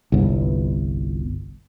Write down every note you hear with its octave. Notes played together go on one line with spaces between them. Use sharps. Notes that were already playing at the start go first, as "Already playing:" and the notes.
G1 C2